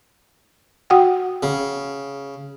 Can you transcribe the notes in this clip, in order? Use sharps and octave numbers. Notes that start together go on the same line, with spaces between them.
F#4 F#5 G5
C#3